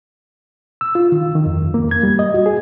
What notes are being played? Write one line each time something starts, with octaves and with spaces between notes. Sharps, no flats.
E6
F4
D#3
D#3
F2
F2
A#3
G#6
G3
D#5
F#4
G#4